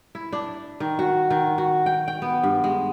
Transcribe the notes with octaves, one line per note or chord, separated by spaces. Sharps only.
E4
D4
D#3
F#4
D#3
F#4
G5
G5
B3
G2
G#3